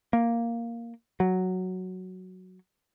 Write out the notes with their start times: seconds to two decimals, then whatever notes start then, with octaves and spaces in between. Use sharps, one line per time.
0.13 A#3
1.20 F#3